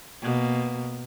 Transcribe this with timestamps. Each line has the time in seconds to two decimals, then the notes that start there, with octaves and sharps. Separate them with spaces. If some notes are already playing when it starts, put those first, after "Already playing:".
0.22 B2 A#3